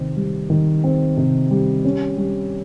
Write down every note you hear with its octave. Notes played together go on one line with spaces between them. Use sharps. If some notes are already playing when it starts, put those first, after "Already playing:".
Already playing: C3 D#3 C4
G3
D#3
C4
C3
G3
C#4
G3